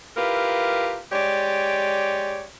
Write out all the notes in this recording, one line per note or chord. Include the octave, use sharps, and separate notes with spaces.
E4 F4 G4 A#4 B4
G#3 G4 C#5 D5